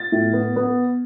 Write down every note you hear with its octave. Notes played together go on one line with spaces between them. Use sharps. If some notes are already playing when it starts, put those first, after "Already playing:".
Already playing: A6
A2
B3
B3